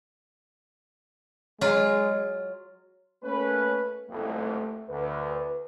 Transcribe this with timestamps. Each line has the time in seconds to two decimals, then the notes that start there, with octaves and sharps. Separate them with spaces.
1.61 F#3 G#3 F4
3.24 A3 A#3 C#4 B4
4.10 F#1 C2 F2 A3
4.89 D2 B4